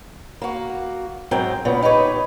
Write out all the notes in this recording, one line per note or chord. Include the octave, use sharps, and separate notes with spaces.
A#3 F#4
G#2 F#3 C4 A#4 G5
A#2 C#3 B3
D#4 G4 B4 C#5